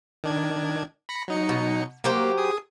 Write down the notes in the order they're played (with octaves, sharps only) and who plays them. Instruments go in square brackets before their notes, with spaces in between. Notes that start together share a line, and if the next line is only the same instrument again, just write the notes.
[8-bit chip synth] D#3 D4 G#6
B5 A#6 C#7
F#3 D#4 C#7
[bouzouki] B2
[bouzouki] F#3 G4 C5 [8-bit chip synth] A#3
[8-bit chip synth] G#4 D#6